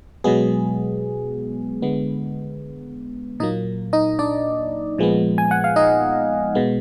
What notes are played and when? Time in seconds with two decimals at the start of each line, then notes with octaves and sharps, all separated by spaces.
0.24 B2 F#3 G#3 B3 G#4
1.82 D3 G#3 B3
3.40 A#2 F#3 A#3 D#4 D#5
3.93 D#4 D#5
4.19 D4 D5
4.98 A#2 F3 G#3 B3
5.38 G#5
5.51 F#5
5.64 F5
5.76 D#4 D#5
6.55 B2 G#3 B3